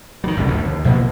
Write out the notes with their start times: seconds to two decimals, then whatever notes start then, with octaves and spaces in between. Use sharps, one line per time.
0.24 D#3 F#3
0.37 G1 C2 G3 C#4
0.48 G1 D2 D3
0.65 D#2
0.85 A#1 E2 B2 A#3